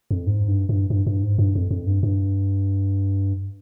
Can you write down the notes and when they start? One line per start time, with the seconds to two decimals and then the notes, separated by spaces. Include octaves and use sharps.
0.11 F2
0.27 G#2
0.48 G2
0.69 G2
0.90 G2
1.07 G2
1.23 G#2
1.38 G2
1.55 F2
1.71 F2
1.87 G2
2.03 G2